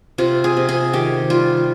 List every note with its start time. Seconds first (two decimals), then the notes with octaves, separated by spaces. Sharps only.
0.18 C3 F4
0.44 G#4
0.57 C3
0.69 G#4
0.93 D#3 G4
1.30 G3 F4